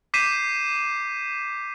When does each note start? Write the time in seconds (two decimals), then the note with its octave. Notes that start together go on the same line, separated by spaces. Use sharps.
0.14 D6 G6 B6 C7 D#7 E7